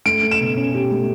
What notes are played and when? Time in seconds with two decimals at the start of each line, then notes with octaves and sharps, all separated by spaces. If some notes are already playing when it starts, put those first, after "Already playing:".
0.05 A3 D7
0.23 A3
0.31 E7
0.40 B2
0.56 C#4
0.74 G4
0.92 A3